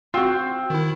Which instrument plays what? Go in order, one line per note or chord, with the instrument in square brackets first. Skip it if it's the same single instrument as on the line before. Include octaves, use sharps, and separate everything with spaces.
[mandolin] C4 [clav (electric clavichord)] F4 F#4
[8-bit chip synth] D#3 E4